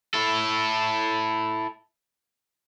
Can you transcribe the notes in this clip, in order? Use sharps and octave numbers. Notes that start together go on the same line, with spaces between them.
E4 A4